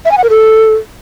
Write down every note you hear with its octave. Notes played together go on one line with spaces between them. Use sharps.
E5
G#5
F#5
A#4
A4